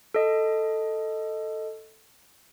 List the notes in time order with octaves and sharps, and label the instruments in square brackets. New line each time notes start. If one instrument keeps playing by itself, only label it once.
[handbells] A4 D#5